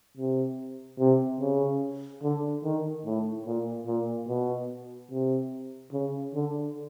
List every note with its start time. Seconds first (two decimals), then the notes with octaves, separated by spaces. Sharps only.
0.17 C3
1.00 C3
1.41 C#3
2.23 D3
2.64 D#3
3.05 A2
3.46 A#2
3.87 A#2
4.28 B2
5.11 C3
5.93 C#3
6.35 D3